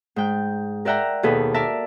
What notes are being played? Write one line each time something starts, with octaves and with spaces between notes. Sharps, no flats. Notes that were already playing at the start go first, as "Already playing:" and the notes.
G#2 G5 G6
A#4 D5 E5 F#5 G5 A#5
D#2 B2 G#4 A4 B4
A#4 D5 E5 A5